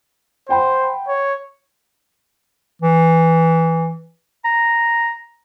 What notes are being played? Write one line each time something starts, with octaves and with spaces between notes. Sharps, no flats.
C5 F#5 G5 B5
C#5
E3
A#5